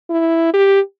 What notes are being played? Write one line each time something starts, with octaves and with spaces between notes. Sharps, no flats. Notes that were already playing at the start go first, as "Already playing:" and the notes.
E4
G4